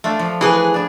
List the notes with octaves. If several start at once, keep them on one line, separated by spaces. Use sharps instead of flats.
A3 D4 F4
F3
E3 G#4 B4
D4 G#4